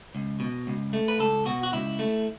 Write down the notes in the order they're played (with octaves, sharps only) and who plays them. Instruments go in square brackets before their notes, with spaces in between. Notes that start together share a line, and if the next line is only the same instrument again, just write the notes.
[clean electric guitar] C#2
B2
C#2
A3
B4
C#2 A4
B2 F#4
F#4
C#2 E4
A3